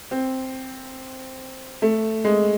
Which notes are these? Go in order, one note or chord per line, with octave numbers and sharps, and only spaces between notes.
C4
A3
G#3